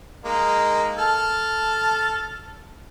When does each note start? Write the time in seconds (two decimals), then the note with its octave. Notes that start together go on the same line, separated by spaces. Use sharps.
0.25 G#3 A#3 D#4
0.98 A4 A5 F6